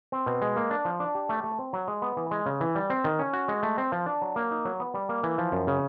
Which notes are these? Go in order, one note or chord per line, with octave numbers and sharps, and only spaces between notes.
C4
B2
G#3
A#3
D4
F3
D4
G4
A3
A3
C4
F#3
G#3
B3
E3
G#3
C#3
E3
G3
C4
D#3
C#4
F#4
G#3
A3
C4
F3
D4
F#3
A#3
D#4
F#3
B3
G3
A#3
E3
F3
F#2
C#3